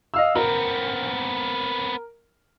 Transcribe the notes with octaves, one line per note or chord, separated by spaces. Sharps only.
D#5 F5 E6
B3 C4 A#4